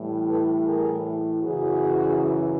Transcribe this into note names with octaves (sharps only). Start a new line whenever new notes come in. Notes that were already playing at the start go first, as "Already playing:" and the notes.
Already playing: A2 E3 G3
A4 B4
G#4 A#4
F#2 C#3 E3 F#4 G#4